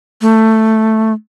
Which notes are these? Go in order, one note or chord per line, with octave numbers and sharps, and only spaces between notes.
A3